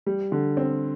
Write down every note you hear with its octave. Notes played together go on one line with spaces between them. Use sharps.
G3
D3
C4